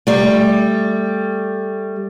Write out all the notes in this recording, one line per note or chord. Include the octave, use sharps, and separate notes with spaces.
G3 A3